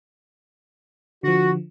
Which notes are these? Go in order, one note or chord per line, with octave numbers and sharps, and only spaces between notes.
D3 F3 F#4